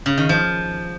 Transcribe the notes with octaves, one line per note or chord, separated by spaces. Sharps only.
C#3
D#3
F3